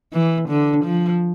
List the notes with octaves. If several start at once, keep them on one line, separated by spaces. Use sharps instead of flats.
E3
D3
F3